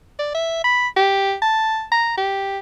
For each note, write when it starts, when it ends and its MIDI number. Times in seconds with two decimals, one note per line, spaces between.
0.19 0.34 74
0.35 0.63 76
0.64 0.88 83
0.97 1.34 67
1.42 1.84 81
1.92 2.15 82
2.17 2.59 67